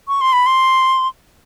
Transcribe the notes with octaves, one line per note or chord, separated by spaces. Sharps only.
C#6
C6
B5
C6